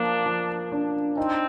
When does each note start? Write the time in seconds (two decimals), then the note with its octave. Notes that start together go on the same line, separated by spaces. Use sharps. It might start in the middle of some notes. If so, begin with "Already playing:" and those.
Already playing: F3 A#3 D4
0.26 F3
0.72 D4
1.17 C4 D#4